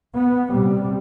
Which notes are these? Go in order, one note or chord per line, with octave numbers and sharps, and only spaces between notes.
B3
C3 G3